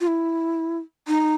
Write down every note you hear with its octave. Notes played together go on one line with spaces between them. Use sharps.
F4
E4
D#4